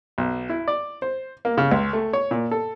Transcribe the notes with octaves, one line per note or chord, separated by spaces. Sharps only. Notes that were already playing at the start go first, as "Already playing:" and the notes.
B1
E4
D5
C5
A#3
C#3
C#2
A3
C#5
A#2
A4